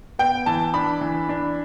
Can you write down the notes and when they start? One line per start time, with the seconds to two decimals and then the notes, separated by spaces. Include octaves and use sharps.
0.19 B3 G5
0.46 E3 A5
0.74 D4 B5
1.01 E3
1.29 D4